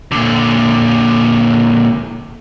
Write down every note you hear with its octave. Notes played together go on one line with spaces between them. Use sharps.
A#2 D3